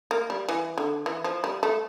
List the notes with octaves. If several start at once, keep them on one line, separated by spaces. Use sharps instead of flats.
A#3
G3
E3
D3
E3
F3
G3
A3